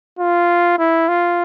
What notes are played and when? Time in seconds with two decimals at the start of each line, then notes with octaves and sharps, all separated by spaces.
0.19 F4
0.78 E4
1.08 F4